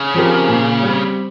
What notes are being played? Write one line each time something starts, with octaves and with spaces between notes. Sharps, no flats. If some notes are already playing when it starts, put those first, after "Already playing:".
Already playing: C#3
F3 C4 G4 A#4
A#2
G3 C4